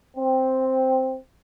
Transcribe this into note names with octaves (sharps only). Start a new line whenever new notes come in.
C4